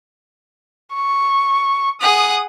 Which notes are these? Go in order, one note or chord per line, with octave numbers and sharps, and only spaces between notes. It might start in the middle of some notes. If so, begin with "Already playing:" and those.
C#6
G#4 F#5 D#6